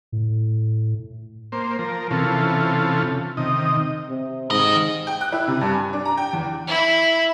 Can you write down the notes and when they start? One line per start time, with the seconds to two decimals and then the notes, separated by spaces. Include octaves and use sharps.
0.12 A2
1.52 A#3 C5
1.79 F3 A#4
2.11 C3 E3 C#4 F4 A4
3.37 C3 D#3 D#5
4.09 C3
4.51 G#2 D#3 D#5
5.07 G5
5.21 F#6
5.32 E4
5.48 C3
5.61 G2
5.74 G#5
5.93 D4
6.05 A#5
6.17 G5
6.33 E2
6.68 E4